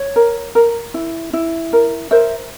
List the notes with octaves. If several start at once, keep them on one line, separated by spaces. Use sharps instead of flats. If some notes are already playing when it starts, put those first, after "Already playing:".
Already playing: C#5
A#4
A#4
E4
E4
A#4
A#4 C5 E5